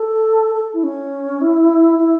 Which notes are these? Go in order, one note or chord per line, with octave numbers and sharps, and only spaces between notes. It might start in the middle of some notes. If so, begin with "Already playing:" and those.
Already playing: A4
A4
E4
C#4
E4
E4